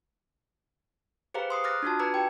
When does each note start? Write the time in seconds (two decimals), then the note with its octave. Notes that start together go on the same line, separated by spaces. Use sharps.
1.34 G4 G#4 B4 C5 F5 A#5
1.50 C6 D#6 C7
1.64 D6 D#6 F6 F#6 A6 A#6
1.83 D4 F4 F#4 A5
1.99 B4 A#5 D6 E6 G#6
2.14 G4 G5